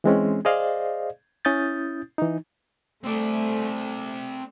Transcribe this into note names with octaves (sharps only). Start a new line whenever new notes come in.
E3 G#3 C4 C#4
G#4 C5 D5 D#5 F5
C#4 E4 D#6 G6 A6
E3 D#4
A3 C4 D5